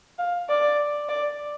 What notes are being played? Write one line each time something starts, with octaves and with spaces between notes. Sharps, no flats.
F5
D5
D5